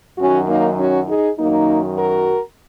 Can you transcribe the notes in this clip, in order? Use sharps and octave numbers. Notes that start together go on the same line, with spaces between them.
F#2 D#3 F#3 C#4 F#4
A#3 D#4
C#4 F#4
D#4 G#4
F#2 D#3 F#3 A#3 D#4
F#4 A#4